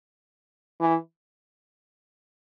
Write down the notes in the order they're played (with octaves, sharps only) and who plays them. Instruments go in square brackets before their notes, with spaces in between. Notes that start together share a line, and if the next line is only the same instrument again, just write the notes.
[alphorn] E3